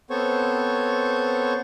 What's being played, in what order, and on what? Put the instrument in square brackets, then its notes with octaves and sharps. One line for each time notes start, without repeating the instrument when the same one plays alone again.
[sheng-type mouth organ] B3 C4 A4 C5 C#5 C#6